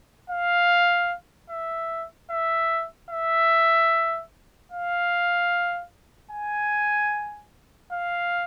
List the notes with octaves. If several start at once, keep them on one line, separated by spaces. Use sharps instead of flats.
F5
E5
E5
E5
F5
G#5
F5